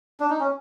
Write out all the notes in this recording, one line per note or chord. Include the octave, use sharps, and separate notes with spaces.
D4
D#4
C#4